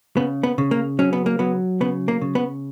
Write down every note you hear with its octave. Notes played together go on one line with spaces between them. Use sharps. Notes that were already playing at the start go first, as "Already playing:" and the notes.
C#3 B3
B3
C#3
A#3
F#3 C#4
B3
A#3
F#3 B3
C#3 B3
A#3
C#3
B3